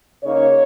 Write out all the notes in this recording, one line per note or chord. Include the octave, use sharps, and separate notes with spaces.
C#3 A#3 D#4 C#5